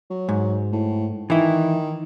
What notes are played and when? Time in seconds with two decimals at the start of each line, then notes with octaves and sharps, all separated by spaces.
0.10 F#3
0.29 G#2
0.72 A2
1.30 D#3 E3 E4